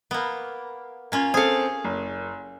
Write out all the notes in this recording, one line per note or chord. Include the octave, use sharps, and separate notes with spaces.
A#3 B3
A#3 C#4 F4
C4 G#4 A4 F5
F#1